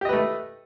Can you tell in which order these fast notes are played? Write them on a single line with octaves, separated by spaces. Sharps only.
G4 D#5 B4 A3